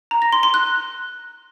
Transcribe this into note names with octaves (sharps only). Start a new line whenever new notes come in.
A#5
A#6
C6
C6
F#6